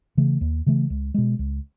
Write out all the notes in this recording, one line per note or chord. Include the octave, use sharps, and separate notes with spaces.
C#3 E3 A3
D#2
C#3 E3 A3
C#2
B2 G#3
C#2